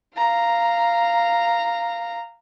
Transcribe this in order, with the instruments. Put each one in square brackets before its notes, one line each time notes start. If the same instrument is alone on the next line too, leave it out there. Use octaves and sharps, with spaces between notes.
[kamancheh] F5 A#5